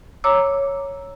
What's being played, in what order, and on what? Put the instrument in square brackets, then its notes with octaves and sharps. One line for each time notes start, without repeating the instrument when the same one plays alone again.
[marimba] C#5 A#5 D6 E6